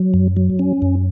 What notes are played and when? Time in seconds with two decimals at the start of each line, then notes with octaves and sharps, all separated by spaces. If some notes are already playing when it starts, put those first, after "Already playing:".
Already playing: F#3
0.14 F#2
0.37 F#3
0.59 C#4
0.82 F#2